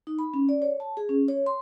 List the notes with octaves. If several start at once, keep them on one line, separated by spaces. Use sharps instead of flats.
D#4
B5
C#4
D5
C#5
A5
G#4
C#4
C#5
C6